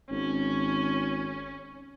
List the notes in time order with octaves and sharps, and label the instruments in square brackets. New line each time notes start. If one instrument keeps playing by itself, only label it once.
[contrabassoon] G#1 [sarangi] C#4